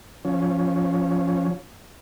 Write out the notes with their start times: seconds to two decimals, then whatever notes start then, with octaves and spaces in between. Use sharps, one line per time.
0.25 F3 C#4